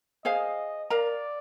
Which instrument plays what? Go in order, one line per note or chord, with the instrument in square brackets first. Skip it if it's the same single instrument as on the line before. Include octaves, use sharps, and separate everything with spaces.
[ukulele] G#4 C5 F5 G#5 [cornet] D#5
[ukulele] A#4 F5 A#5 [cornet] D5